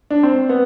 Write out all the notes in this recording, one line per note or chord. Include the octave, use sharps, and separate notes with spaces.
D4
C4
B3